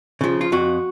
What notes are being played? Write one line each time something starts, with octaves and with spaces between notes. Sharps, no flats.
C#3 F3
F4
F2 F#4